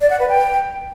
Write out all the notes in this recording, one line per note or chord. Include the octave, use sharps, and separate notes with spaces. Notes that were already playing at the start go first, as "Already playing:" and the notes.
D5
F#5
B4
G5